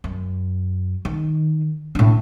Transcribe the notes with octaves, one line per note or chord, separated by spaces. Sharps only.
F#2
D#3
A2 D4